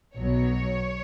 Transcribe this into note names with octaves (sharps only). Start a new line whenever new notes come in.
B1 B2 F#3 C#5